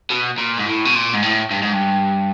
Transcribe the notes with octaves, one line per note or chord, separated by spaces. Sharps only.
B2
A#2
G#2
A2
B2
A#2
G#2
A2
G2
G#2
G2